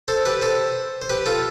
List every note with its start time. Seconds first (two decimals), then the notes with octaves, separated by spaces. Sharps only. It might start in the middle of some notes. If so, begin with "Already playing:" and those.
0.08 A4 C5
0.25 G4 B4
0.42 A4 C5
1.02 C5
1.10 G4 B4
1.26 F4 A4